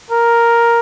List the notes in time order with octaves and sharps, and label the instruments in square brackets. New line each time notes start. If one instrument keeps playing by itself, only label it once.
[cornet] A#4